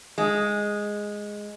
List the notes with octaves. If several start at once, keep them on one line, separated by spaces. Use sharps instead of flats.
G#3